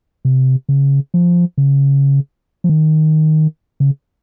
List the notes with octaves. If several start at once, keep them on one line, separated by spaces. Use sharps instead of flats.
C3
C#3
F3
C#3
F3
D#3
C#3